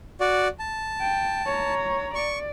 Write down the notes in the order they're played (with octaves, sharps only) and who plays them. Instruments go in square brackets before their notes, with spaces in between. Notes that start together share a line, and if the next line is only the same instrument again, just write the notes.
[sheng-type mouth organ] F#4 D5
A5
[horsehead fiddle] G5
C#5 A#5
[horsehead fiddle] D5 [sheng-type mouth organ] C#6